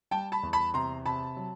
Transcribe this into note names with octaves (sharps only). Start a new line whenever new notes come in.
G3 G5 A5
A5 B5
E2
A5 B5
C3 A#5 C6
C3 A5 B5
F#3